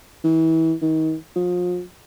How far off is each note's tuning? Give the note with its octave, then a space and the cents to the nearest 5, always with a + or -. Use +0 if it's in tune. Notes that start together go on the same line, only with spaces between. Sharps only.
E3 -30
D#3 +30
F3 +35